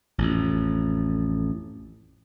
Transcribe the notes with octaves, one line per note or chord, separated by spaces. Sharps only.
A1 F2